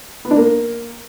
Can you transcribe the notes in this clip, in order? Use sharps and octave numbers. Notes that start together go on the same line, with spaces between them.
B3
D4
A#3